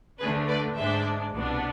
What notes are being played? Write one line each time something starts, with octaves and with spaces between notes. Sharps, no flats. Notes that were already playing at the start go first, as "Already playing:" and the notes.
D2 D3 A3 D4 G#4 B4
B4 D5
G#2 G#3 D4 C5 E5
C2 B2 B3 D4